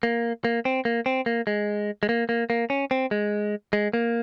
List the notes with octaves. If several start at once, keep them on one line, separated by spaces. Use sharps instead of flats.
A#3
A#3
C4
A#3
C4
A#3
G#3
G#3
A#3
A#3
A#3
C#4
C4
G#3
G#3
A#3